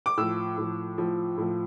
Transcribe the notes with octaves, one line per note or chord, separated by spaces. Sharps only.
D6
A2 F3 E6
A2 F3
A2 F3
A2 F3